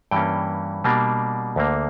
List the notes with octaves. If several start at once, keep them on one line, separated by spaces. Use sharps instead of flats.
G2 E3 G3 A#3 C#4 G5
B2 G3 A#3 D4
D2 D3 A#3